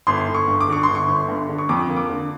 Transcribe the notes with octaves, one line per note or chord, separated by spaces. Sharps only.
G1 C6
G1
C#6
G2
D6
D3 C#6
G1 C6
C#6
G1
G2
D3
C#6
F2 D6
A#3
D6
D3